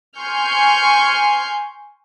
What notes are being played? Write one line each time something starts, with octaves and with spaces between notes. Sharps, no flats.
G#5 C6 C#6 F6 G6